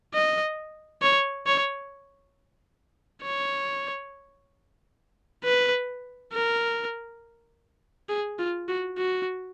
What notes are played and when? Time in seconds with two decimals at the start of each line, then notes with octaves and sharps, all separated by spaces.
0.14 D#5
1.02 C#5
1.46 C#5
3.23 C#5
5.44 B4
6.33 A#4
8.09 G#4
8.39 F4
8.68 F#4
8.97 F#4